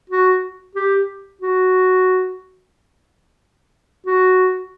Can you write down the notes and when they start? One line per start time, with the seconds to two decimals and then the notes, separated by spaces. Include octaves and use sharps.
0.10 F#4
0.75 G4
1.41 F#4
4.06 F#4